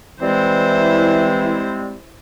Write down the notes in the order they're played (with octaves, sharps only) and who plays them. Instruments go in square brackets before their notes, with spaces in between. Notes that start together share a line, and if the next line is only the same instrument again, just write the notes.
[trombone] E3 [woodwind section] G3 G#3 C4 [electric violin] E4 C5